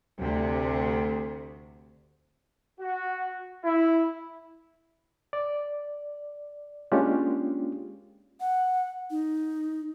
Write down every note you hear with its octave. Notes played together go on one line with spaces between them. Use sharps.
D2 C3
F#4
E4
D5
G#3 A#3 C#4 D4 F4 G4
F#5
D#4